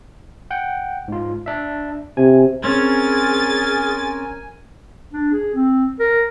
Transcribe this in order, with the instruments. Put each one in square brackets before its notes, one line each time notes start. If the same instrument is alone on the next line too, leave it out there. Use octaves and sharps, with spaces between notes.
[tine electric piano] F#5 G5
G#2 F4
D4 E5
[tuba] C3 [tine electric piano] G#5
[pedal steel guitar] C4 C#4 [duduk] G#4 [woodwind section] A#4 G#5 [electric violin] A6
[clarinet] D4
G#4
C4
A#4